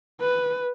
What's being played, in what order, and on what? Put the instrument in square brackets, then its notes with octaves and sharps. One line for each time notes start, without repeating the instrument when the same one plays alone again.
[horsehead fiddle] B4